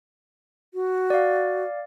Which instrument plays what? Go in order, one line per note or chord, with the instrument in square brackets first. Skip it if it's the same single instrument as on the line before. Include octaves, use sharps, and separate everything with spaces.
[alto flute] F#4
[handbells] D5 F5